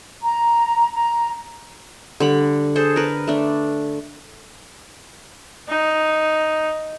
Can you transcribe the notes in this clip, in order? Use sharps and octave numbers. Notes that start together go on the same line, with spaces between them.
A#5
A#5
D3 G3 B5
G#4 A4 C5
A#4 B4
A3 D4
D#4